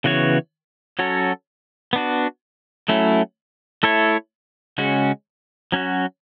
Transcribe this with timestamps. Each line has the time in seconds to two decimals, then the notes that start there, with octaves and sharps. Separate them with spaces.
0.04 C#3 E3 B3 F#4 C#5
0.99 F#3 C#4 F#4 A4 C#5
1.93 B3 D4 F#4
2.88 F#3 A3 C#4 E4
3.83 A3 E4 A4 C#5
4.78 C#3 G#3 C#4 F#4
5.72 F#3 C#4 F#4